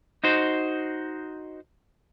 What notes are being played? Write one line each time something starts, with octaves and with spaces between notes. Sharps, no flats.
D#4 F#4 C5